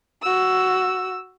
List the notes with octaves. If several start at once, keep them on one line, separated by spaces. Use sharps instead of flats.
F#4 E6